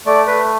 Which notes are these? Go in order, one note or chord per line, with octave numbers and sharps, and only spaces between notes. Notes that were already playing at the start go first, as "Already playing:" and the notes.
A3 D5
A3 B4